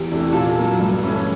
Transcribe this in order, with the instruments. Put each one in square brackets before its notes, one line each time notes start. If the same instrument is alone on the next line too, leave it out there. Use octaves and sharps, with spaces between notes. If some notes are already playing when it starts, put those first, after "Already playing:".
Already playing: [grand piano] E2 [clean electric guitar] G4
[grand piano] C3 E3 A3 D4
[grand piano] A#2 [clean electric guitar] A4
[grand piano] F#3 A#3
G2
E3 A3 C#4 E4